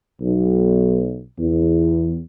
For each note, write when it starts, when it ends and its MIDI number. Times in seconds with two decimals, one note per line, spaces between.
0.22 1.20 35
1.39 2.18 40